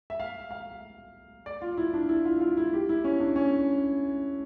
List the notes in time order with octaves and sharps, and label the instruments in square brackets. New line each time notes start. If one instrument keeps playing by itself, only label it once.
[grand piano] E5
F5
F5
D5
F4
E4
D4
E4
F4
F4
E4
G4
E4
C#4
D4
C#4